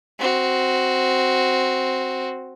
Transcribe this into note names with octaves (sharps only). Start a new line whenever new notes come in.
C4 F#4